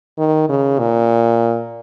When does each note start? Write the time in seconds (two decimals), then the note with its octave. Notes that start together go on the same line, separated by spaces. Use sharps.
0.18 D#3
0.49 C#3
0.79 A#2